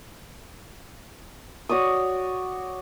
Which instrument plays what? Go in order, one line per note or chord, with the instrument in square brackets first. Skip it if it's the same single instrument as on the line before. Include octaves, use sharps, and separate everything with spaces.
[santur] F#4 C#5 D5 D#6